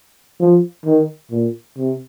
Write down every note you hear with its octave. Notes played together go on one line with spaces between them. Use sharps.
F3
D#3
A#2
C3